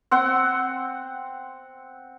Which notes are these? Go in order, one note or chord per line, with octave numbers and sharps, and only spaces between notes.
C4 F#5 C6